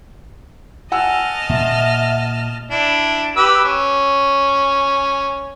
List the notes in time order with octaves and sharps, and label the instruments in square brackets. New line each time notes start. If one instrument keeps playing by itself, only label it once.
[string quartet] D#5 A5 F6 [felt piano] F#5 G#5 E6
[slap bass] A#2 A#3 [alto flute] E5
[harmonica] D4 E4
G4 B4 E6
C#4